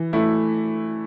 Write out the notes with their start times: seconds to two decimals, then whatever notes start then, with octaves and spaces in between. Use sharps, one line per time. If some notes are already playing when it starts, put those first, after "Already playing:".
Already playing: E3
0.13 A3 E4